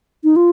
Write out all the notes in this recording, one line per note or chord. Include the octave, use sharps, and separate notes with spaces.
D#4
F4